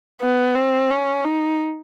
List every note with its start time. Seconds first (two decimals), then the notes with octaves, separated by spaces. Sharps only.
0.21 B3
0.55 C4
0.90 C#4
1.25 D#4